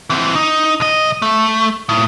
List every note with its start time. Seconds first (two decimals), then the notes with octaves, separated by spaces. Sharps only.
0.10 E3 C4
0.36 D#4
0.80 B1 D#5
1.22 A3
1.89 A2